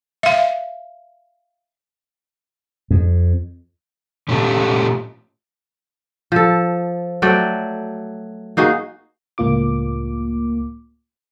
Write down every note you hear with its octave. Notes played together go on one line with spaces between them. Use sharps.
E5 F5
F2
A#2 A3 C#4 F4 G4 A4
F3 A4
F#3 A3 D5 G5
A#3 D#4 F#4 G#4
C#2 A2 A#3 F4 D6